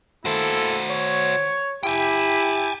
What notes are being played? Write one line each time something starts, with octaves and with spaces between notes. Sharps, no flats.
A#3 E4 F#4 A4 C5
C#5
E4 G4 G5 G#5